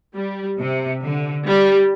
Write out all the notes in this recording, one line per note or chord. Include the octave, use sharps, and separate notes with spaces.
G3
C3
D3
G3